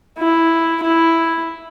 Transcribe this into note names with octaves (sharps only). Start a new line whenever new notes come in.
E4
E4